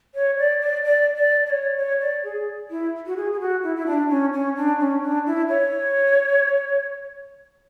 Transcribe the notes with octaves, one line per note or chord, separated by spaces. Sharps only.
C#5
D5
D5
D5
D5
D5
C#5
C#5
D5
G#4
E4
F#4
G#4
G#4
F#4
E4
E4
D4
C#4
C#4
D4
C#4
D4
E4
C#5